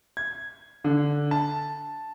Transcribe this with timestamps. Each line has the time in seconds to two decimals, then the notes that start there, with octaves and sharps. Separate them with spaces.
0.17 G#6
0.84 D3
1.31 A5